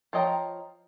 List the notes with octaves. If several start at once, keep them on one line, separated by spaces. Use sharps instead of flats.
F3 C#5 D#5 G5 A#5